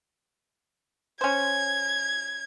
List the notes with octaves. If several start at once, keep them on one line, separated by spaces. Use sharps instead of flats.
C#4 C5 G#6